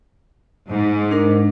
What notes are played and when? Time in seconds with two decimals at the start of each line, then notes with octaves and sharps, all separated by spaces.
0.70 G#2
1.11 D4 A#4